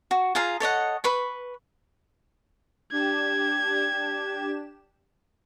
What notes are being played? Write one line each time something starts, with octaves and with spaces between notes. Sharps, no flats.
F#4
F4 G#4 F5 A#5
A4 C#5 D#5 F#5
B4 B5 C#6
D4 G4 G#6 E7